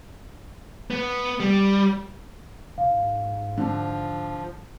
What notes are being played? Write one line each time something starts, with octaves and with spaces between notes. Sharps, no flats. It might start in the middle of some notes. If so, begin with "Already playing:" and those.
B3
G3
G#2 F5
D3 F3